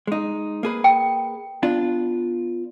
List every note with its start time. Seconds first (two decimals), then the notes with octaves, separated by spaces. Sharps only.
0.07 G#3 D#4
0.63 A#3 G#4 B4
0.84 G5
1.63 B3 D4 F4